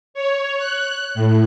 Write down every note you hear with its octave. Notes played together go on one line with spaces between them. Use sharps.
C#5
F#6
A2